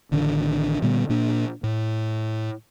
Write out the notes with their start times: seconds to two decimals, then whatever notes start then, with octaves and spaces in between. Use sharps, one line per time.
0.12 A1 D3 D#3 D4
0.82 A#2 D3 G3 B3
1.09 A#2 A#3 D4
1.64 A2